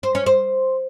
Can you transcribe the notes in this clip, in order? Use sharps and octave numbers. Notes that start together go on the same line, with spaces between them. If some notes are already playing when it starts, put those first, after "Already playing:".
C5
C#4
C5